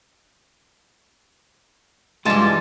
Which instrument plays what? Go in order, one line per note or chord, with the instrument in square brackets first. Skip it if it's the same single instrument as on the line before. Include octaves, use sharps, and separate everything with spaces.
[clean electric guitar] G2 F4 A5 [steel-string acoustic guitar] E3 G3 G#3